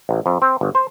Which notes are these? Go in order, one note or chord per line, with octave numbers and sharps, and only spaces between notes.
A1
F2
C4
G1
C5